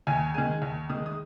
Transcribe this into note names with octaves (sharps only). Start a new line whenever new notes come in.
D#2 G#5
D#3 G#3 G#5
D#2
D#3 G#3 D#6
D#6